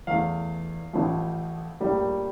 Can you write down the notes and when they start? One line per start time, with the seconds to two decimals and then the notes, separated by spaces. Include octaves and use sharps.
0.07 E2 E3 A3 F5
0.93 A1 A2 F3 A3
1.80 A#1 A2 G3 A#3